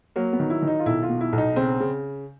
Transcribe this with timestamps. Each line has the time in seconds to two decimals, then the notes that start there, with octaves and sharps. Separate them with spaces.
0.16 F#3 A#3
0.33 B3
0.39 D#3
0.50 E4
0.62 D#3
0.68 D#4
0.80 F4
0.86 B1 E4
1.03 F4
1.09 B2
1.21 E4
1.32 B1
1.38 D#4
1.56 C#3 C4
1.80 C#3